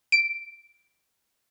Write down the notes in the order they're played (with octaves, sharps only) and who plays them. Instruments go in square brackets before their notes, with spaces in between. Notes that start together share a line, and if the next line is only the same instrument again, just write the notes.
[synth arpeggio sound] D7